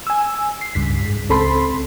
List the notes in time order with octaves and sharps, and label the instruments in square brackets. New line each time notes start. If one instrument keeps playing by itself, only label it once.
[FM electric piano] G#5 E6
C7
C#2 G2 B6
G#2
C#2 C4 A4 B5 C6